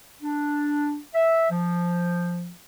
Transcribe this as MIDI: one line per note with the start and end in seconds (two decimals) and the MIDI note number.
0.21 0.99 62
1.15 1.47 76
1.51 2.52 53